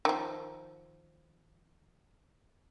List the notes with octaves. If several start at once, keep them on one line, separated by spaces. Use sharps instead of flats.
D#3 F3